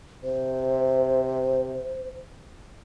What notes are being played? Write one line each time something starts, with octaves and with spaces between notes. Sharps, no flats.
C3 C5